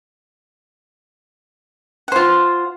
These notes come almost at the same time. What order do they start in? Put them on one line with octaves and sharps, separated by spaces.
F#5 C5 F4